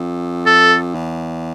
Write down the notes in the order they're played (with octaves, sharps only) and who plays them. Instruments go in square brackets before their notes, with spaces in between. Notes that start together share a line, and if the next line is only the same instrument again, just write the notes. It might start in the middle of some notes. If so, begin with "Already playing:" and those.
Already playing: [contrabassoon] F2
[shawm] A4
[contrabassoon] E2